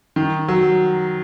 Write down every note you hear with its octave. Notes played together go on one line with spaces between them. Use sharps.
D#3
F#3